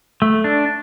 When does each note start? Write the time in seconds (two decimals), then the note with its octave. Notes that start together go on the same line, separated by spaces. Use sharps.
0.22 A3
0.44 D4